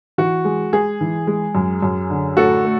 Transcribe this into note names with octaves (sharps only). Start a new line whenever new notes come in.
E3 F#4
G#3
G#3 G#4
E3
G#3
F#2
F#2
D3
A2 F#4 A4
A3